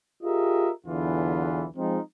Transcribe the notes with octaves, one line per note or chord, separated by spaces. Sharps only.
F4 G4 G#4 A#4 D#5 E5
B1 E2 D3 E3 F4 B4
F3 G#3 C4 D#4 F4